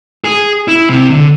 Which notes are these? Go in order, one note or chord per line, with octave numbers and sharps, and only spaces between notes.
G#4
E4
C3
D3